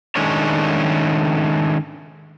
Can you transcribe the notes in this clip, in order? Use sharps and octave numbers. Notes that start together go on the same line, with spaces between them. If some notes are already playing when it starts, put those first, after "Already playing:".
D#3 G#3 A3 C#4 D4 C#5